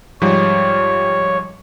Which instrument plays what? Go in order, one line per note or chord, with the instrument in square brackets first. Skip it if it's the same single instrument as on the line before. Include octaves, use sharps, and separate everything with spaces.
[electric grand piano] G#2 F3 G3 [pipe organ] C#5